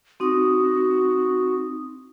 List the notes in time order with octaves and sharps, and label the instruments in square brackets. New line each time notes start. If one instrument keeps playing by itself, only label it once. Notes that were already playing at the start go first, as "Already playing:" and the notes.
[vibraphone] C4 D#4 D#6 [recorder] F#4